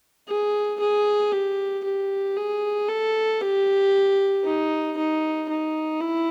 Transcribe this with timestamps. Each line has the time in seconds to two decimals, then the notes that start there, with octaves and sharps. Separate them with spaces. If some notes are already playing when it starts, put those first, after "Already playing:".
0.28 G#4
0.80 G#4
1.32 G4
1.84 G4
2.36 G#4
2.89 A4
3.41 G4
4.44 D#4
4.97 D#4
5.49 D#4
6.00 E4